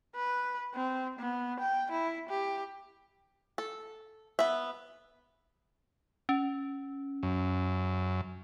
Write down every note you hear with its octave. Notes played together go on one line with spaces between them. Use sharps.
B4
C4
B3
G5
E4
G4
A4
B3 E5
C#4
F#2